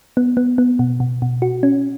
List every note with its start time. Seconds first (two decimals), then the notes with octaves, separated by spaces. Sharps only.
0.17 B3
0.37 B3
0.58 B3
0.79 B2
1.00 B2
1.22 B2
1.42 F#4
1.63 C#4